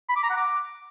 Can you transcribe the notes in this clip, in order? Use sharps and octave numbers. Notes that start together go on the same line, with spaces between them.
B5
D6
A#5
F#5
D6